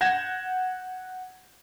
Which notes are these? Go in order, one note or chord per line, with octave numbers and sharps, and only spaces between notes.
F#5 G6 G#6 A#6 E7